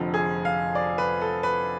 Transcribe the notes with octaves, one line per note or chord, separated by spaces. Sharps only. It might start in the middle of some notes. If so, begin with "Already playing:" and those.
Already playing: F1 F2 D3 F3
G#4
F5
D5
B4
A4
B4